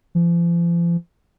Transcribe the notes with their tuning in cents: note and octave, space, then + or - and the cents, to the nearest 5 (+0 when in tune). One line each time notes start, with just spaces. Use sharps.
F3 -40